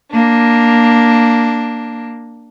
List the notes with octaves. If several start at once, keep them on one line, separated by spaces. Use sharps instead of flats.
A#3 D4